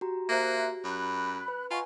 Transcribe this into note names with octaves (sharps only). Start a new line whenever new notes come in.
F#4 G4 A#5
A#3 C5 E5 F#6
F#2 B5 F#6
B4
F4 D#5 F#5 G#5 A#5 B5 C#6